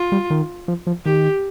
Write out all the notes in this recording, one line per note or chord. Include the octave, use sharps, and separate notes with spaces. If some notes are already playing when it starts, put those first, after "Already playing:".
Already playing: F4
G3
D#3
F3
F3
D#3 G4